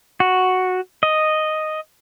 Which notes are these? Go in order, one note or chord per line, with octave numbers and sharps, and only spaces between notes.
F#4
D#5